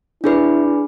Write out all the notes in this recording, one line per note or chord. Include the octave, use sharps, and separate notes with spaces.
D4 E4 G#4 B4